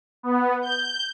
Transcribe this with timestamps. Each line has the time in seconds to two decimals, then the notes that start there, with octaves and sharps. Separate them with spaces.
0.23 B3
0.62 G6